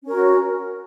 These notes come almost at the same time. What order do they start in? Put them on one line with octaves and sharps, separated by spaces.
C#4 A#4 F#4